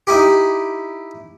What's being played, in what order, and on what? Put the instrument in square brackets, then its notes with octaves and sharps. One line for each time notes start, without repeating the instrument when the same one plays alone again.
[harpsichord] D#4 E4 G4